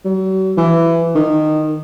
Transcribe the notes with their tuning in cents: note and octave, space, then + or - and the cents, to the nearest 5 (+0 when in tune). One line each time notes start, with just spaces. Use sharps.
F#3 +40
E3 +15
D#3 -15